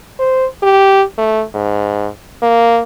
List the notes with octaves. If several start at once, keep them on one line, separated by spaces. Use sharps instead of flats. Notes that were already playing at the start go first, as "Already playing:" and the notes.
C5
G4
A3
G#2
A#3